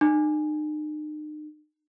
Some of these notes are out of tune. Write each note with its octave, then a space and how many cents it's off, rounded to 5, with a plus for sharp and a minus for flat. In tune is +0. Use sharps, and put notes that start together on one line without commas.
D#4 -40